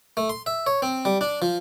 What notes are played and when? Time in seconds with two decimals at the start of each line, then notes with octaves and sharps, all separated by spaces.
0.17 A3
0.30 C6
0.46 E5
0.67 C#5
0.82 C4
1.05 G3
1.21 D4
1.42 F3